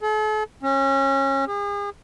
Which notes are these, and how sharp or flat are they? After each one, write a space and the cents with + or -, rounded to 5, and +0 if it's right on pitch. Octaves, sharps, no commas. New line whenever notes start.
A4 -45
C#4 -25
G#4 -40